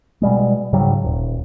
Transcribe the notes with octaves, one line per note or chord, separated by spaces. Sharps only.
B2 G3 G#3
G#2 C#3 F#3 G3
D#1